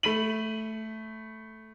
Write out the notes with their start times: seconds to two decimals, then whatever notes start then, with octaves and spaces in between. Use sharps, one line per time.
0.03 A3 B5 B6 D#7 F#7